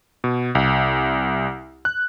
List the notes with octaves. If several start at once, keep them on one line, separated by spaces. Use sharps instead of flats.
B2
C2
F#6